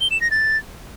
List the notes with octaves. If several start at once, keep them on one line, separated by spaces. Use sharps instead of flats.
G7
E7
A#6
A6